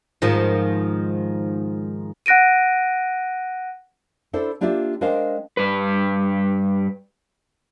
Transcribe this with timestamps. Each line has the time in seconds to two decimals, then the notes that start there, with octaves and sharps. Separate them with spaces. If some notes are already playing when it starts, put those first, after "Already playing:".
0.22 G#2 D#3 F3
2.26 F#5 F#6 A#6 D7 D#7
4.33 D4 E4 A4 C5
4.61 A#3 D4 F4 G4 D5 E5
5.01 G#3 D4 A#4 C5 F5 G5
5.57 G2 B4